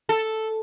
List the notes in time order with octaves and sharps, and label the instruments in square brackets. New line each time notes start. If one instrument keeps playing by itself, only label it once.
[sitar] A4